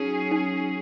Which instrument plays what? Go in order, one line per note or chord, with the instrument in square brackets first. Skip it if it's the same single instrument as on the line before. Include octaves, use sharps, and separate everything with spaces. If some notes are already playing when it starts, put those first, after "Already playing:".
Already playing: [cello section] F#3 C#4 G#4 [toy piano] D#4
[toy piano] D#4